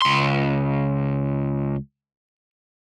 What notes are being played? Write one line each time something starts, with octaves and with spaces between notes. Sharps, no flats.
C#2 C6